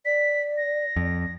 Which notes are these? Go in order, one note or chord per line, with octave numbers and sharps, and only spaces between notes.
D5 B6
A#6
F2